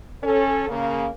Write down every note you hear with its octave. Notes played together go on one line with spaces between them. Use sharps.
C#4 A4
C#3 A#3